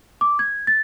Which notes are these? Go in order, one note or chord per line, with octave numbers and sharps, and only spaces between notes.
D6
G#6
A6